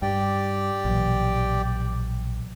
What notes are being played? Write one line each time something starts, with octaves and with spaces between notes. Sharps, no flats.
G2 G4 D5 G5
A#1 B2 E3 F#3